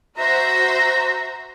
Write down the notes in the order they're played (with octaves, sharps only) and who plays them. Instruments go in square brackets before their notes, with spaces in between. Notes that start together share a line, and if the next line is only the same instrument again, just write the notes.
[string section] F#4 C5 E5 [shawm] A#5